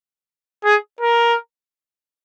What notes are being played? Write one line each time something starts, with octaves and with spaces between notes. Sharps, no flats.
G#4
A#4